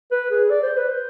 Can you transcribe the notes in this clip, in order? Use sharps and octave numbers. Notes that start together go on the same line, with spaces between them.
B4
G#4
D5
C5
B4
C5